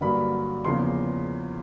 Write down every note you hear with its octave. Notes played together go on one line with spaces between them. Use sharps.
G2 D3 F#3 A#3 B5
E2 C#3 F3 A#3 C6